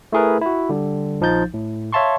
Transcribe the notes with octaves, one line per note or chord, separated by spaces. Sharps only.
A3 E4 G#4 A#4 B4
E4 F#4
D3 G3
A#1 F3 D#4 G6 A6
A2
C#5 E5 F5 A5 C6 C#6